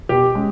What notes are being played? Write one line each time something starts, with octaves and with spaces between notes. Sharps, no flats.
B2 G4
G#3 C#4